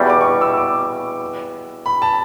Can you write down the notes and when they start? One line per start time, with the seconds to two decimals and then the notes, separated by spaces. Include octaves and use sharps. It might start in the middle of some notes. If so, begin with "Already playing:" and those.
Already playing: E2 B2 G3
0.10 D6
0.21 C#6
0.25 D6
0.41 E6
0.57 D6
1.86 B5
2.02 A5